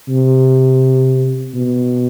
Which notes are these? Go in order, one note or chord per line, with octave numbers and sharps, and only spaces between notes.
C3
B2